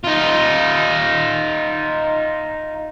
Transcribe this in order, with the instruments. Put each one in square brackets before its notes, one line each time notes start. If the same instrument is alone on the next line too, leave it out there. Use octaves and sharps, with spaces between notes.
[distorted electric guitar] D#4 F4